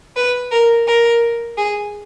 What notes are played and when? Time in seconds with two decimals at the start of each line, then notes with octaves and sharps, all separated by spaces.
0.16 B4
0.51 A#4
0.87 A#4
1.57 G#4